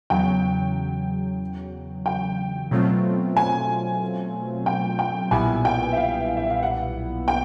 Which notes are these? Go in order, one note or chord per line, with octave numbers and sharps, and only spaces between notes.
E2 C#3 F#3 G5
G5
B2 F#3 A3 C4 F4
G#5
G5
G5
B1 A#2 G3 B3 E4 G#5
G5
E5
F5
E5
F5
F#5
G5